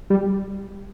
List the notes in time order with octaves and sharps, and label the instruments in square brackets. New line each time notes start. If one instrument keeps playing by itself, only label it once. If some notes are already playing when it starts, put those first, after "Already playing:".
[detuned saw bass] G3